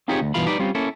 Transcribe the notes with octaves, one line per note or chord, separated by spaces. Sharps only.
C4 D#4 F4 G4 G#4 C#5
D2
G2 B2 E3 F4 F5 B5
G3 D#4 B4 D5
G3 C4 C#4 F4
A#3 C#4 E4 A4